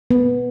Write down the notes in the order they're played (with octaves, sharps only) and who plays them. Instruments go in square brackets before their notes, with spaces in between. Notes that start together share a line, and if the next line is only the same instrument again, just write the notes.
[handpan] B3